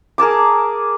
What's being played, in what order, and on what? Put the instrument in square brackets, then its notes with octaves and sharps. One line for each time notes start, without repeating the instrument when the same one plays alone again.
[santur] G#4 A#4 A5 D6